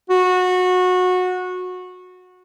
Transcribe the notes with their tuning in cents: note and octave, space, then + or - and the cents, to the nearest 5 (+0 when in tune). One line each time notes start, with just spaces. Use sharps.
F#4 -20